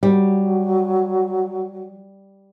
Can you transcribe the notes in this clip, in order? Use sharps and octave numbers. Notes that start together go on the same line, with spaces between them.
F#3 G3